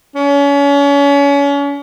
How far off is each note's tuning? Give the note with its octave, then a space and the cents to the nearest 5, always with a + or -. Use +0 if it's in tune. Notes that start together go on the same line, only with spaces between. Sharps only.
C#4 +35